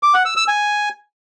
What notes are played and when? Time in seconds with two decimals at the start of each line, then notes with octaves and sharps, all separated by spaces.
0.03 D6
0.14 F#5
0.25 E6
0.37 E6
0.48 G#5